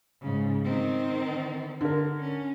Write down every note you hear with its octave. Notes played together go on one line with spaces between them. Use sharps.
G#2 C#3
D#3 C4
D3 A#4
C#4